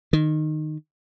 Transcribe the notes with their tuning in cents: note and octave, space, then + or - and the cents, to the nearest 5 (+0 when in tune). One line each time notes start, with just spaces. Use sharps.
D#3 -15